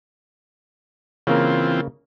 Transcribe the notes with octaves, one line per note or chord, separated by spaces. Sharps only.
C#3 E3 A#3 C4 F4 A#4